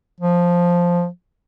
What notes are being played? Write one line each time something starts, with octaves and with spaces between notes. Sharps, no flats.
F3